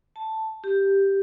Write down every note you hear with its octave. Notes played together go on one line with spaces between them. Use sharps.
A5
G4